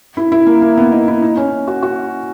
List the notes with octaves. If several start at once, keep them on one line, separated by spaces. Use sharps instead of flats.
E4
E4
A#3
A#3
B3
D#4
E4
D#4
C#4
F#4
F#4